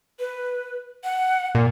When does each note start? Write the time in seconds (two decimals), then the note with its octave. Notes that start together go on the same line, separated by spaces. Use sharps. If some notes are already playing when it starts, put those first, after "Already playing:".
0.19 B4
1.04 F#5
1.55 A#2